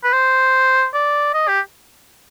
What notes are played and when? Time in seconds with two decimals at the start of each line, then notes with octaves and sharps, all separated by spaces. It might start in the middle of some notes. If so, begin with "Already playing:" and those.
0.04 B4
0.13 C5
0.94 D5
1.34 D#5
1.48 G4